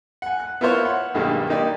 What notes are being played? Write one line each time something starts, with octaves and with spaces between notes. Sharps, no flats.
F#5 G#5
F#6
B3 E4 F4 A#4 C5 C#5
F#5
B1 G2 D#3 G3 G#3 A#3
A#3 D#4 G4 D5